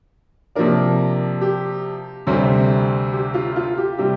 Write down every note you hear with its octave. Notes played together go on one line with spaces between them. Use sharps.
C3 F3 A#3 D4 A#4
G4
D2 C3 G3 C4
G4
F4
F4
G4
C3 G3 G4